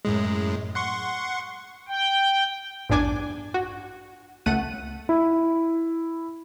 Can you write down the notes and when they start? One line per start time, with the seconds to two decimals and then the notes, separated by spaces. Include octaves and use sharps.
0.05 F#2 A2 G#3
0.75 F#5 C6 C#6
1.88 G5
2.89 A1 E2 G2 D4 G#5 D6
3.54 F#4
4.46 C#2 A3 F#5 D#7
5.09 E4